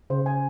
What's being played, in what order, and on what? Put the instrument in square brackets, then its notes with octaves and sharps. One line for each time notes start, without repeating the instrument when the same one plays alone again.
[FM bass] C#3 [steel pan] C5
[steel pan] G#5